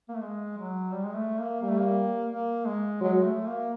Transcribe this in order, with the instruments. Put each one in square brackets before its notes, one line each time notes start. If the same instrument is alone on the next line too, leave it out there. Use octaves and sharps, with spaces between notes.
[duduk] A#3
A3
G#3
F#3
G3
G#3
A3
A#3
[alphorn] G3 [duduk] A#3
[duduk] A3
A#3
A#3
G#3
[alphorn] F#3 [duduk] G#3
[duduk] A3
A#3